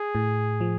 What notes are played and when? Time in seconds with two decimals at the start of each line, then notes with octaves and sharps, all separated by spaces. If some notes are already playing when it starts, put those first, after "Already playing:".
Already playing: G#4
0.15 A2
0.61 F3